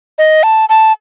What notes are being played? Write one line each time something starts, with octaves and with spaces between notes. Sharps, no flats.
D#5
A5
A5